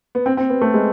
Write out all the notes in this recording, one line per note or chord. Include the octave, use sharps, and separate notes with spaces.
B3
C4
C4
B3
A3
G#3